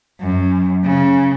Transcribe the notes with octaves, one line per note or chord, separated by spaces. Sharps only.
F#2
C#3